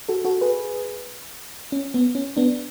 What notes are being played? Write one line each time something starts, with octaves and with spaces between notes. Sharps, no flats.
F#4 A4
F#4 A4
G#4 B4
C#4
B3
C#4
B3 D4